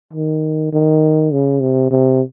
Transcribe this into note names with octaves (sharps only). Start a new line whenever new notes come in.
D#3
D#3
C#3
C3
C3